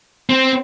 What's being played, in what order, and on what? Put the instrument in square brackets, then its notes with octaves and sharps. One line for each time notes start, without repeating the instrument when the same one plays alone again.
[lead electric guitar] C4